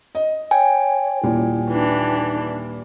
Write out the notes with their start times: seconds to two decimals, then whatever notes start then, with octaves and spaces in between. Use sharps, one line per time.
0.15 D#5
0.51 C#5 G5 G#5
1.24 D#1 A#2 E4
1.70 E3 D4 D#4